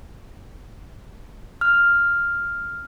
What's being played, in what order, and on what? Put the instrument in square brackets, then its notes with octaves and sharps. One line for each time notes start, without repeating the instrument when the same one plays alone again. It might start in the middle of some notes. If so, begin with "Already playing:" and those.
[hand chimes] F6